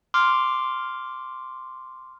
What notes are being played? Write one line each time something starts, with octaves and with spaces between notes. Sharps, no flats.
C6 D6 F6